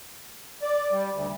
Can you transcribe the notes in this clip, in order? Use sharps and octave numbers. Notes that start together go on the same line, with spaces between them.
D5
G3
D2